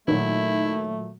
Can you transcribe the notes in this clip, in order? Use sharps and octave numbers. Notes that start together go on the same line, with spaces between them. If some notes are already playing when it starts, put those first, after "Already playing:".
A#2 D#3 F#3 A3 E4